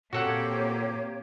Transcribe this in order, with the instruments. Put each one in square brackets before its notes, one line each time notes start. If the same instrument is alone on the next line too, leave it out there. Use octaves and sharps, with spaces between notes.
[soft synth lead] A#2 [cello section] A#3 C4 G4 [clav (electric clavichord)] F#4 A4 F#5 [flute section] C#5